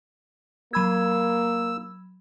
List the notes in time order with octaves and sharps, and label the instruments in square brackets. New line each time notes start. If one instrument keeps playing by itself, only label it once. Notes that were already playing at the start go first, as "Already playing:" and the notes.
[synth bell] F#3 B5 G#6 [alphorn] A#3 [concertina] E6